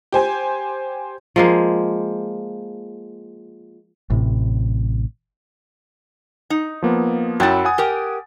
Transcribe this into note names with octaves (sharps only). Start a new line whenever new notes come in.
G4 C5 G#5
F3 G#3 A#3
A1 A2 C3
D#4
F3 A#3 B3
F#2 F#3 E4 G5 A6
F#5 G#5 D#6
G4 A#4 G5